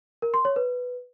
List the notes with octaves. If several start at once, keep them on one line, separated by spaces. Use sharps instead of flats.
A#4
C6
C#5
B4